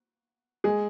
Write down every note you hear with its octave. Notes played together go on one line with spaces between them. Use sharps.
G#3 G#4